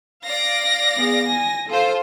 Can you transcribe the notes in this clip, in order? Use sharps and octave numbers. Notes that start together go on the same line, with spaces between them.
D5 F5 A#6
B3 G#4
G#5
F4 A4 C5